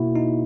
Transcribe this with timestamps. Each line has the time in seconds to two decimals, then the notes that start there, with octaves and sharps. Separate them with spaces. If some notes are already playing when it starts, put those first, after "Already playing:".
Already playing: B2 A#3 E4 F#4
0.16 D#4